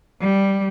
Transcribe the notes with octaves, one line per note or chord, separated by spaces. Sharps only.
G3